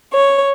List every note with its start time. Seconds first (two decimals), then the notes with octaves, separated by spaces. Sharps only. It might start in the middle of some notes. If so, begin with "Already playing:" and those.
0.13 C#5